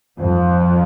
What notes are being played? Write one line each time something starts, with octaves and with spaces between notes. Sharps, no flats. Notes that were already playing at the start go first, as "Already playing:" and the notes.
F2 G#2 F3